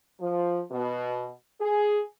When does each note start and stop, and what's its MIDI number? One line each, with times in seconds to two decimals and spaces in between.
0.20 0.61 53
0.72 1.29 47
1.60 2.01 68